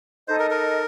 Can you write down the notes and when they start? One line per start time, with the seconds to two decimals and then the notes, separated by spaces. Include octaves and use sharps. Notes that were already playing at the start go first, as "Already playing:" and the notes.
0.28 D#4 A4 C5 D#5
0.40 A#4
0.50 A#4